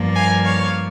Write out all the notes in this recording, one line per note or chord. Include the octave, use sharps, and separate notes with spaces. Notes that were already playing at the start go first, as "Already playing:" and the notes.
Already playing: G2 F3 A#3
F5 G#5
C#5 F5